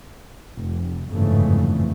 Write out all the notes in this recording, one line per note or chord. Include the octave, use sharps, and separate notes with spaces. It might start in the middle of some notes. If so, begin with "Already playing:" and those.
F1
G1 F2 G#2 C#3 E3 A3